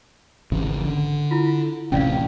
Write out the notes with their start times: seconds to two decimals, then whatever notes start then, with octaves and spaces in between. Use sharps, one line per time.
0.52 G#1 C#3 E3
0.85 D3
1.31 E4 F4
1.92 D#1 A1 C3 C#4 D5 F5